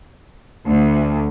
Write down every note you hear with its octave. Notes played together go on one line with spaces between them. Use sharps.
D2